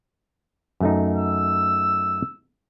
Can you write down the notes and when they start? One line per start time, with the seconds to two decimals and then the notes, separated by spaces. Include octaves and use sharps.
0.80 F#2 A3 D#4
1.16 E6